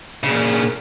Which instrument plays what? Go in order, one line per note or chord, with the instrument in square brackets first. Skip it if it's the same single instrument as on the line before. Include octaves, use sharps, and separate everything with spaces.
[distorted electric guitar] A#2 C#3